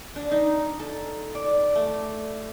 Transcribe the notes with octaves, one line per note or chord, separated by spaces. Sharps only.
D4
D#4
A4
D5
A3